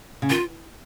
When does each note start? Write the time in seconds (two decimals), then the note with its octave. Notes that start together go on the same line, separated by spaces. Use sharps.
0.22 C#3
0.30 D#3 F4